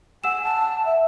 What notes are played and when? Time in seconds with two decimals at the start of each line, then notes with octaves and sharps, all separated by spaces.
0.24 F#5 G#5 E6 E7
0.43 A5
0.85 E5